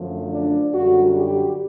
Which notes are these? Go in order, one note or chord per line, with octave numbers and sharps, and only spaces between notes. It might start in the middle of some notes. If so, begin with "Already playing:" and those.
Already playing: F#2 D3 F3 A3
D4
F#2 D3 G3 F#4
G4